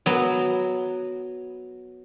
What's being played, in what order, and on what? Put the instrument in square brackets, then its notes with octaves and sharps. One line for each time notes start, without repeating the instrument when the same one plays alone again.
[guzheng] F#3 B3